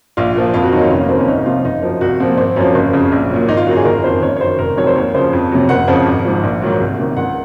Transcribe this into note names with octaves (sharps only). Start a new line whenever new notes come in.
A#1 F4
A#2 F3
F2 F4
F#4
D#3 F#3 D#4
F4
F1 C#4
A#3
F2 D#3 C4
C#4
C2 D#4
C3 F3 F4
F#1 D#4
F#2 F3
C2 F#4
A#2 F3 C4
G#1 C4
F#2 F3 C#4
F#1
F2 C#3
A#1
A#2 F#3
G#1 D#4
F4
F#2 D#3 F#3 F#4
G#4
F#1 A#4
F2 D#3 C5
F#1 C#5
C#5
F#2 D#3 C5
F1 A#4
F2 D#3 F#3 C#5
C5
D#2 C#5
C#3 F3 C5
F2
C3 F#3
F#1 F#5
F2 C#3 F3
G#1
G#2 F3
A#1
G#2 D#3 F#3
C2
C3 D#3
C#2 F#5